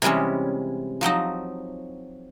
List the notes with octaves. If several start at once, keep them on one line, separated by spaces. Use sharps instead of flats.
C3 E3 G3 G#3 C#4
F3 F#3 C4 D#4